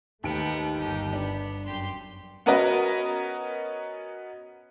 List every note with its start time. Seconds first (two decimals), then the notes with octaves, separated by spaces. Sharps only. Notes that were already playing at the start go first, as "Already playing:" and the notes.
0.24 D#2 A3 B3 D#4 D7
0.76 G1 D#4 G4
1.13 B3 D4
1.66 F#2 G4 C6
2.46 B3 C#4 F#4 A#4 B4 D#5